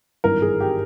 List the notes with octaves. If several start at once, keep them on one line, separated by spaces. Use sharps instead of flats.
G#1 G2 E3 A#4
G#4
G4